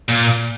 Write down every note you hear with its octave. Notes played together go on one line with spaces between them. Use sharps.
A#2